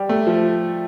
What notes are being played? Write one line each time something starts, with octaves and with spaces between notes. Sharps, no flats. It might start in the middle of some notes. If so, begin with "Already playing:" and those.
Already playing: G3
A3
F3